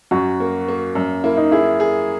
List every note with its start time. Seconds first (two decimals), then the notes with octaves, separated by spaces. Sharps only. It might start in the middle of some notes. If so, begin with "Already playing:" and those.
0.11 F#2 F#4
0.40 A#3
0.68 A#3
0.95 F#2
1.24 A#3 E4
1.37 D#4
1.51 E4 G#4
1.80 G#4